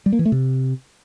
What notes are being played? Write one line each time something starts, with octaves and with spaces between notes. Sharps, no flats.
G3
A#3
E3
A3
C3